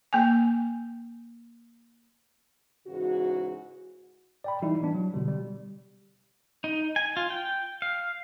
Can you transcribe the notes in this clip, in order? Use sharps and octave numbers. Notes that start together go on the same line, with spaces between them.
A#3 G5 G#5
G#2 C#3 E3 F#4
D5 G5 B5
E3 G3 D#4 E4
E3 B3 D4
F#3
B2 D3 G3
G3
D#4
G#5
F4
G5
F5